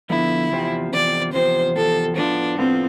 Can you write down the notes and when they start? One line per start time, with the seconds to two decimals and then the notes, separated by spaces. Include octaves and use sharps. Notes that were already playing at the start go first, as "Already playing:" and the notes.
0.10 D3 F3 B3 E4
0.52 E2 C3 F3 C4
0.93 E2 C3 F3 C4 D5
1.34 E2 C3 F3 C4 C5
1.76 E2 C3 F3 C4 A4
2.17 A2 F3 B3 D4 F4
2.58 A2 F3 B3 C4 F4